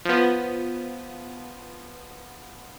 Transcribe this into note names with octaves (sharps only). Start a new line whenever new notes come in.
F3 B3